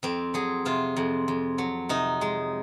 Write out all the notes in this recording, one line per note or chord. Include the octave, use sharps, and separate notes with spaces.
F2 C4
F#3 G#4
C3 F4
F2
F2
F#3
C3 D#4
G#3